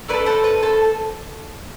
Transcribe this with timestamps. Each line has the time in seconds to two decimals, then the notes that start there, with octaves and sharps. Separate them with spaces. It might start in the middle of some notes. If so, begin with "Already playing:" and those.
0.08 A3 E4 B4 D5
0.14 A4
0.26 A4 C5
0.44 B4
0.62 A4 C5